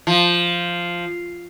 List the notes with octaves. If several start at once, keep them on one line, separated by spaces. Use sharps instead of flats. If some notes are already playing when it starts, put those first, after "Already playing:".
F3